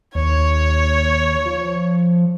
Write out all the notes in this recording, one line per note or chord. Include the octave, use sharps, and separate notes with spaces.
D#2 C#5
F3